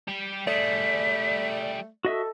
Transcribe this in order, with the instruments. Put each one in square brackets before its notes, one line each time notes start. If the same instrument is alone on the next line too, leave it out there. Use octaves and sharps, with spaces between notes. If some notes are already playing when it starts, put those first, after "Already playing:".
[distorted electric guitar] G3 G4
[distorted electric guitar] G3 G#4 [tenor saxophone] A3 [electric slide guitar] D5 [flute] B6
[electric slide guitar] F#4 D#5 E5 [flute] A4